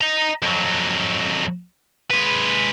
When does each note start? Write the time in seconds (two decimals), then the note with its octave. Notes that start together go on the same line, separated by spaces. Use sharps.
0.01 D#5 A#5
0.42 F2 F#3
2.11 G#3 B4